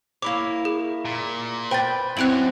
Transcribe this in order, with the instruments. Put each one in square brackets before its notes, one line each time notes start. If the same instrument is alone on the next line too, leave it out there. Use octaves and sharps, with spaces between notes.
[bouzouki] A#3 E4 C#5 [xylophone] D6
[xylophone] G#4
[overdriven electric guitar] A#2
[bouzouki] B4 G5 [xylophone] C5 A6
[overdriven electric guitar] F#2 [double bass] C4 [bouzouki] E4 C#5 [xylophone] F#6 D7 F#7